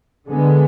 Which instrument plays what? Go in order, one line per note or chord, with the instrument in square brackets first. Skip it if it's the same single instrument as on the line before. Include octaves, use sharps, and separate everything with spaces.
[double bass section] D3 G#3 B3